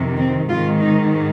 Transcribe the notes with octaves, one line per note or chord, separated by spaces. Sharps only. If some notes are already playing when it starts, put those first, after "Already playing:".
Already playing: F2 C3 D#3
C4
G#2 D#3 F4
D#4